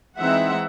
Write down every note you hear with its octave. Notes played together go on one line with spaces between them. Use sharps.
E3 G#3 C4 D#4 E5 F#5